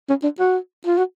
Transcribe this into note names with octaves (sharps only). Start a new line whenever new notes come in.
C#4
D4
F#4
F4
F#4